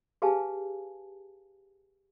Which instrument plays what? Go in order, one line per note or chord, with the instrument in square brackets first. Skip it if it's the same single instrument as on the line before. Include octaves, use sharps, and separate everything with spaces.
[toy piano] G4 G#4 B4 F5 G#5 A5